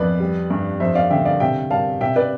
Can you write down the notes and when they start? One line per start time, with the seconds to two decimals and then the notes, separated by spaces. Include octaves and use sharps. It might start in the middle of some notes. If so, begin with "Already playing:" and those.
Already playing: F2 B3 B4 D5
0.20 G3
0.51 G2
0.80 F2 C5 E5
0.95 D5 F5
1.11 D3 E5 G5
1.25 D5 F5
1.40 C3 E5 G5
1.71 G3 F5 A5
2.01 C3 E5 G5
2.16 B4 D5